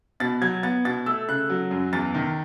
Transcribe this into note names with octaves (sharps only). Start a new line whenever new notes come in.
B2 A6
F#3 G#6
B3 A6
B2 A6
A3 E6
C#3 F#6
F#3
F#2
E2 A6
D#3